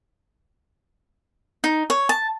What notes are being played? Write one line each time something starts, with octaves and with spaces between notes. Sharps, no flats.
D#4
C#5
A5